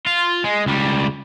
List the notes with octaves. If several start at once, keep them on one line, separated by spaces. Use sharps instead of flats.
F4
G#3
C#2 G3